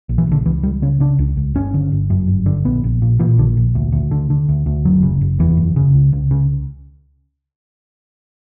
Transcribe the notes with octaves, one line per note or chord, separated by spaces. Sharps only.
A#1
E3
A#1 D3
C#2 E3
C#2 G3
C#3 C#4
C#3 D4
C#2
C#2
G1 C#4
D3
G1
F#2
G1
D3
A#1 B3
A#1
A#2
A#2 E3
A#1 D3
A#1
D2
D2
D3
D3
D2
D2
F#1 F#3
C#3
F#1
E2 E3
F#1
C#3
C#2
C#2
C#3